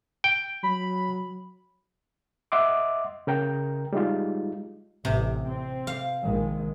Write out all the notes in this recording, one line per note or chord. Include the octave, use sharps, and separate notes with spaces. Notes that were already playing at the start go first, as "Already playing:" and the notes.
G5
F#3 B5
D#5 E5 F#5 C6 D6
C#3 A#4 G5 A#5
G3 G#3 D#4 F4
A1 C3
C4
F5
A#1 D#3 G#3